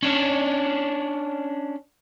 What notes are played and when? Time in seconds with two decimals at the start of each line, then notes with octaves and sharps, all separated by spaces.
0.03 C#4 D4